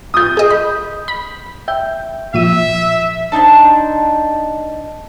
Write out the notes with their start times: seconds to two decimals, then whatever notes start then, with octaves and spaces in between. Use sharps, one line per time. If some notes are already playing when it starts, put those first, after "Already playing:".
0.14 D#6 G6
0.37 G#4 D#5
0.50 B5
1.08 B5
1.68 E5 G5 G6
2.34 A#2 F3 E5 D#7
3.32 D4 D#4 C5 A5